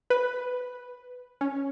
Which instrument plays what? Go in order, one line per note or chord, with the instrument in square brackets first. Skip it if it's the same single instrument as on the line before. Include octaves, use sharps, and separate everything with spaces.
[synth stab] B4
C#4